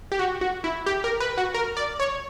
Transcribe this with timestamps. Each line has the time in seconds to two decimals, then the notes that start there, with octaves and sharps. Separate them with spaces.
0.12 G4
0.19 F#4
0.41 F#4
0.64 E4
0.86 G4
1.04 A#4
1.20 B4
1.38 F#4
1.54 A#4
1.77 D5
2.00 C#5